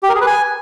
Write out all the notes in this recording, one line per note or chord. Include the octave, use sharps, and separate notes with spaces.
G4
A#4
G#4
B4
G#5